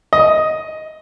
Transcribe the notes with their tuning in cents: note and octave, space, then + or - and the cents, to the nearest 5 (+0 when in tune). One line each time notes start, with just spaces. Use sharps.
D#5 +5